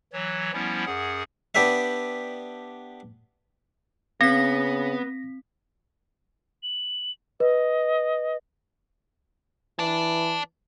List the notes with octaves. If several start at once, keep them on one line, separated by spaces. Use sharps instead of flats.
E3 F#3 C#5
F3 G3 B3 C#4 E4
F#2 G#4 F#5
B3 D4 G4 B4 E5
C#3 B3 C4 A#6 B6
F#7
B4 D#5
E3 D5 A5